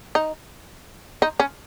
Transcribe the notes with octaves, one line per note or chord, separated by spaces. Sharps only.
D#4
D#4
C#4